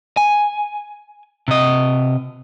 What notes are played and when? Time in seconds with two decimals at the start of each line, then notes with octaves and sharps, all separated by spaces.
0.17 G#5
1.48 C3 D#5